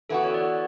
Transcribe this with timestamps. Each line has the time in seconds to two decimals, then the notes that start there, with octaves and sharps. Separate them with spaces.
0.09 E3 B3 F#4 A4
0.24 C#5
0.34 D5